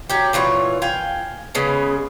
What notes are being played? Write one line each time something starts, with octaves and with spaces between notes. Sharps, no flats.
F#3 G4
A#2 E3 F4 C#5
F5 G5 G#5
C#3 G#3 B3 C#4